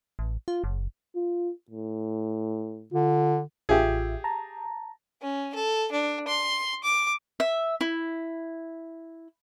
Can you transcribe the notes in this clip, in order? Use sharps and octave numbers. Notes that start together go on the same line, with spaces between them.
A1
F4
F#1
F4
A2
D3 F4
A1 F4 G4 G#4 E5
A5 A#5
C#4
A4
D4
C6
D6
E5
E4